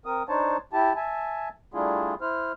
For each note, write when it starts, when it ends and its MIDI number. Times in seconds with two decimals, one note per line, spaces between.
0.06 0.23 60
0.06 0.23 70
0.06 0.23 87
0.29 0.57 62
0.29 0.57 63
0.29 0.57 72
0.29 0.57 73
0.29 0.57 81
0.73 0.93 64
0.73 0.93 67
0.73 0.93 81
0.96 1.49 76
0.96 1.49 80
0.96 1.49 81
1.74 2.14 55
1.74 2.14 57
1.74 2.14 62
1.74 2.14 64
1.74 2.14 65
1.74 2.14 68
2.21 2.52 64
2.21 2.52 72
2.21 2.52 89